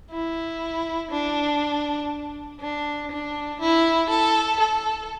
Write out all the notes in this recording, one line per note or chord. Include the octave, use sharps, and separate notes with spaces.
E4
D4
D4
D4
E4
A4
A4